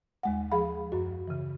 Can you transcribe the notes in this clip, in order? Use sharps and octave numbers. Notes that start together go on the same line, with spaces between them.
D#2 G#3 F#5
F3 G#4 F5 B5
F#2 F#4
C#3 E3